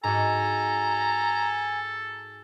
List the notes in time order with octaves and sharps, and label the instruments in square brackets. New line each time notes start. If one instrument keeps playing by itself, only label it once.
[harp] G#2 F#4 [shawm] A4 [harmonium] G#5 [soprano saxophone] A#5